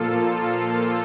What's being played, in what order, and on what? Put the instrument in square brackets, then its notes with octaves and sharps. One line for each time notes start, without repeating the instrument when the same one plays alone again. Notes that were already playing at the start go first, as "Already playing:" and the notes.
Already playing: [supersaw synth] A#2 F3 A#3 F4 A4